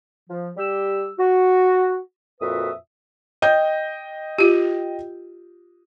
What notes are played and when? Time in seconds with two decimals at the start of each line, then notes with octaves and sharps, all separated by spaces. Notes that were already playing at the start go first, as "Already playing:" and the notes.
0.29 F3
0.57 G3 G4 E6
1.19 F#4
2.40 F2 A#2 F#4 B4 E5 D#6
3.42 D#5 G5 G6
4.39 F4 G4